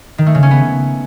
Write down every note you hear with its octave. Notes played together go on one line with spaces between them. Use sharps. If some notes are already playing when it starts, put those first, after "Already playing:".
D#3
A3
C#3
C#4
B3